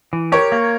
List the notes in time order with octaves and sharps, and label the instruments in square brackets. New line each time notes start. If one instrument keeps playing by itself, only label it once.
[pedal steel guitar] E3
[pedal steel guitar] G4 [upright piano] A#4 C#5
[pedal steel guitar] A#3